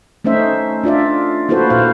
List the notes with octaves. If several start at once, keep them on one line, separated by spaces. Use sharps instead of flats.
A3 C#4 D#4 C5 E5
D4 F4 D5 E5
A#3 E4 F#4 A4 B4 C5
A#2 C5 F5